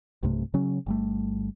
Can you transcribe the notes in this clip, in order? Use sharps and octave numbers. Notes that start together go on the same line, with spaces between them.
B1 G2 C3 A3
C#3 F#3 C#4
G1 G3 A3